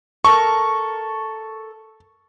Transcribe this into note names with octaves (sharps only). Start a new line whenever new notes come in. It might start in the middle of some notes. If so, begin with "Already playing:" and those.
A4 A#4 C#6